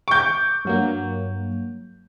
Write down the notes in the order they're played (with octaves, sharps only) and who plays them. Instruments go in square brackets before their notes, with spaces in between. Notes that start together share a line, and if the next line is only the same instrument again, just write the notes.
[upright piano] C#6 G6 [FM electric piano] D6
[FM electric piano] G2 F#3 A#3